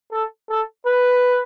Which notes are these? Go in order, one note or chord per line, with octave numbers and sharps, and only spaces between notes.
A4
A4
B4